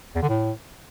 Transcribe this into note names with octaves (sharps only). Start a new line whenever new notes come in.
E2
D3
A2